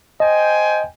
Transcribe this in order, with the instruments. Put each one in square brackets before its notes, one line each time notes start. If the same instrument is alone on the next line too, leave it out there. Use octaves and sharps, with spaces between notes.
[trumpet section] C5 G5 G#5 [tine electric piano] D#5